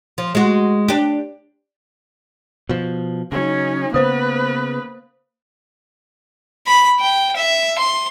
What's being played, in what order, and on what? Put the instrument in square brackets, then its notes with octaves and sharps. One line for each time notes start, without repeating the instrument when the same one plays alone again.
[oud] F3
G#3 F#4
D4 G4
[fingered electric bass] B2 F3
[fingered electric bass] C#3 F#3 [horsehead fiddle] C#4 D#4
[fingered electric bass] C#3 B3 [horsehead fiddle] A#3 B4 [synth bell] C5 D#6
[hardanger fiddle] B5
G5
E5
C6